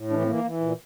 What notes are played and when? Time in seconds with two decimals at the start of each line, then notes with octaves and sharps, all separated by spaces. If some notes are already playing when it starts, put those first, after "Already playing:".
Already playing: A2
0.10 E3 D4
0.22 C4
0.27 E3 A#3
0.44 E3
0.61 A#2